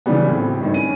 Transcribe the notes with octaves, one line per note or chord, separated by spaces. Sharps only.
C#3 E3 F#3 G3 B3
A2 C4
G#1 G2
C#4 D#7